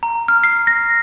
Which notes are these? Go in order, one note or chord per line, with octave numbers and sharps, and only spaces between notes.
A#5
F6
C7
A#6